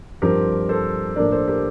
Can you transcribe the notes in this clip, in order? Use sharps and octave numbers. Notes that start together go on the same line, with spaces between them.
G2 F3 C4 G4 A#4
A4 C5
A2 F3 A#3 D4 A#4 D5
A4 C5
G4 A#4